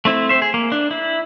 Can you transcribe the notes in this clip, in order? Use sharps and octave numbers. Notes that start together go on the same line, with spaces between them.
A3 C4 E4
C4 C5 E5
G#4
A#3
D4
E4